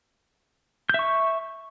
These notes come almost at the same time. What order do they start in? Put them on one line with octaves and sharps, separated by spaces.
G6 E5 C#6